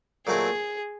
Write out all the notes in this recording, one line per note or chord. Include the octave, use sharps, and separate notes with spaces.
A#2 F#3 A3 C4 E4 G#4